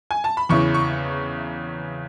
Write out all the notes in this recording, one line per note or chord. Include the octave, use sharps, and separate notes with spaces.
G#5
A5
B5
E2 C#3 E3 C#6
C#6